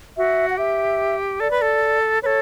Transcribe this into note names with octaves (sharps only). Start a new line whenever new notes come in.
F#4 E5
F#5
G4 E5
A4 D5
B4
A4
A4 B4 C#5